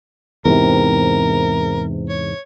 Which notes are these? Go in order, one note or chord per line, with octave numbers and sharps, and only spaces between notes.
E2 G#2 C3 A#4
C#5